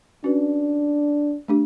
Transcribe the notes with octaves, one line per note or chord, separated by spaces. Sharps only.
C#4 D4 F#4 B4
A3 D4 G4